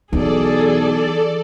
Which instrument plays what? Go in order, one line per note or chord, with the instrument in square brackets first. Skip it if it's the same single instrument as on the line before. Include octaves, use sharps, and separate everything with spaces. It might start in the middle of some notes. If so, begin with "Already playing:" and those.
[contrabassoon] B1 [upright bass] E3 [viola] G#4 [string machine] A4 D5